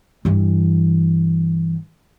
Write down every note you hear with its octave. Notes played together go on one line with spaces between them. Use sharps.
G2 E3